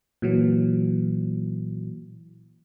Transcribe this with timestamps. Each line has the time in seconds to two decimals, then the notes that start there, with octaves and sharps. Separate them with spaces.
0.22 A#2 E3 F#3